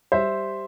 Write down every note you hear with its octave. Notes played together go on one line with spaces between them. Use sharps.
G3 C5 E5